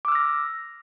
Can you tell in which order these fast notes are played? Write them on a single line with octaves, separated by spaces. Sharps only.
D6 E6 F6 A#6